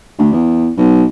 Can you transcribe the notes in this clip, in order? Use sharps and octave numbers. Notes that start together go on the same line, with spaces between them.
D2
E2
B1